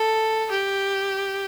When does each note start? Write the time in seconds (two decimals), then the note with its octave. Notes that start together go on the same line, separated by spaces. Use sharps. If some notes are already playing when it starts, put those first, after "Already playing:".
Already playing: A4
0.51 G4